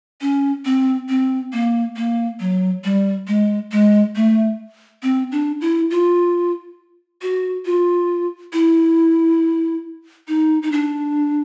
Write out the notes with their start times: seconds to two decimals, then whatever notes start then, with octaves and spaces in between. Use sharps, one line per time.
0.21 C#4
0.65 C4
1.09 C4
1.53 A#3
1.96 A#3
2.40 F#3
2.84 G3
3.28 G#3
3.72 G#3
4.16 A3
5.03 C4
5.32 D4
5.61 E4
5.91 F4
7.22 F#4
7.65 F4
8.53 E4
10.28 D#4
10.63 D#4
10.72 D4